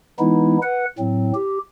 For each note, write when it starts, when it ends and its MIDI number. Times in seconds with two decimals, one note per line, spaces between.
0.19 0.58 52
0.19 0.58 56
0.19 0.58 59
0.19 0.58 63
0.19 0.58 64
0.62 0.85 71
0.62 0.85 78
0.99 1.32 45
0.99 1.32 54
0.99 1.32 60
1.35 1.59 67